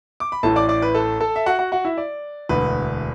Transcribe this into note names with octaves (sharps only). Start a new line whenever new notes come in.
D6
B5
A1 A2 E3 A4 A5
D5 D6
D5 D6
B4 B5
A4 A5
A4 A5
E5
F#4 F#5
F#4 F#5
F#4 F#5
E4 E5
D5
E1 D2 D3 B4